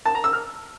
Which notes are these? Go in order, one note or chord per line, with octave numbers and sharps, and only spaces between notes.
A5
A#5
E6
F6